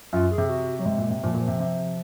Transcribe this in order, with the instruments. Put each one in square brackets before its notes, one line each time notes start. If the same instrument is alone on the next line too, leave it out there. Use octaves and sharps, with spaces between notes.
[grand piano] F#2 [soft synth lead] F4
[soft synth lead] G#4
[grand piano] C3
[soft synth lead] F#4
F#3
[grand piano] C3 [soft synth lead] G#3
[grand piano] A#2
C3
[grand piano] A#2 [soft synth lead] F3
[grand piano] A#2 [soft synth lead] F3
[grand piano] C3
C3